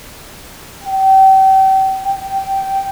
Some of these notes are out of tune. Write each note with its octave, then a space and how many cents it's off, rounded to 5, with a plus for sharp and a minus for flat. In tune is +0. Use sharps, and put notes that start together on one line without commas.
G5 -35
G5 -10